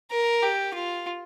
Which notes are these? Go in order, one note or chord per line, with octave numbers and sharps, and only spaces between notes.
A#4
G4
F4